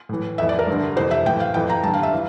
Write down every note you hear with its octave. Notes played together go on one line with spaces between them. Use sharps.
A2 E3
F2 E3 E5
D5
A#4
G2
D3
F2 C3 E3 C5
E5
A2 E3 G5
F5
F2 E3 G5
A#5
G2 D3 A5
F5
E5
E3 F5